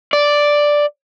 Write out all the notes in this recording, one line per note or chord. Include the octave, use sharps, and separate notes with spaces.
D5